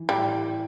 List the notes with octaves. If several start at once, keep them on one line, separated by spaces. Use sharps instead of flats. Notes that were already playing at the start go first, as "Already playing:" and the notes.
Already playing: E3
A2 G3